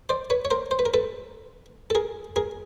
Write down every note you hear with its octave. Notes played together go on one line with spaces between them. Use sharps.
C5 D5
B4 C#5
C#5
A#4 C5
C5
B4
A#4
A4 B4
A4
G#4 A#4
G#4 A#4